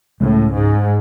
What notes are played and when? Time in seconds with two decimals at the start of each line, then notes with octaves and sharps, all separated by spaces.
0.21 C#2 A2 C#3 G#3
0.53 G#2